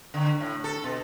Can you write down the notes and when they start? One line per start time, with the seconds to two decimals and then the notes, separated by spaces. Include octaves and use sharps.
0.14 D3
0.40 A2
0.64 A4
0.84 B2